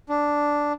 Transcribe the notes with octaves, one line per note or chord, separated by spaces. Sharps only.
D4